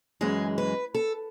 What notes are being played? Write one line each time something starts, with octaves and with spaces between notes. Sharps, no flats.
F#2 E3 G#3 G#4
B4
A4